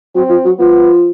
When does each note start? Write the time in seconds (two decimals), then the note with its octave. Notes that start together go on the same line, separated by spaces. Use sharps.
0.15 F#3 C4
0.29 F3
0.45 F#3
0.58 F3 B3